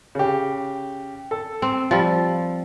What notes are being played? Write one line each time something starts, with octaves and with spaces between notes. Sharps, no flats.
C#3 G4
A4
C4
F3 G3